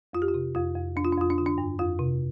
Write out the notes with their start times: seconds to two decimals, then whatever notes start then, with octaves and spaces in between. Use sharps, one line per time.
0.13 F2 F4
0.22 G4
0.28 F4
0.34 C3
0.55 F2 F4
0.76 F2
0.96 F2 D4
1.05 F4
1.13 D4
1.18 F2 F4
1.30 D4
1.38 D3 F4
1.46 D4
1.58 G2
1.79 F2 F4
1.99 C3